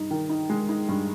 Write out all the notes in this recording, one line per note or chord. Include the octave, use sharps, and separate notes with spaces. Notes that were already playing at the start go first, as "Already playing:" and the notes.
Already playing: G2 D#4
D#3
D#4
G#3
D#4
G2